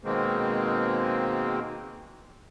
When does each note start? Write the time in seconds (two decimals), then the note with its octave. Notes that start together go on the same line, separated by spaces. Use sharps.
0.04 B2 D#3 G#3 A#3 C4